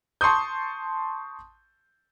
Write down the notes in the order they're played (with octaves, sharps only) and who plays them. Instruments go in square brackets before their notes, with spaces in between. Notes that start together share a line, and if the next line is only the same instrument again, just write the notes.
[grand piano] A5 C6 C#6 D#6 G6